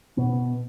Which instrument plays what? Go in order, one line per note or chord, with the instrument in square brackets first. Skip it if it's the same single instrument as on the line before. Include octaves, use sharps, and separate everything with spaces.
[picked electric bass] B2 B3